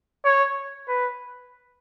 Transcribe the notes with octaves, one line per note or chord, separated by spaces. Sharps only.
C#5
B4